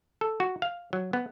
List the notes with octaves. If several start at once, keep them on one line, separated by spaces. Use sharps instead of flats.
A4
F#4
F5
F#3
B3